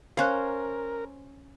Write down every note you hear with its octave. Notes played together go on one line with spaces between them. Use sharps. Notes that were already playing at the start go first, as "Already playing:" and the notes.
C#4 A#4 C5 F5 F#6